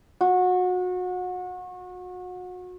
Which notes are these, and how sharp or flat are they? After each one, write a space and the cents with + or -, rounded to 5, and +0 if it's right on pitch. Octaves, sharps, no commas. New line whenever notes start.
F#4 -30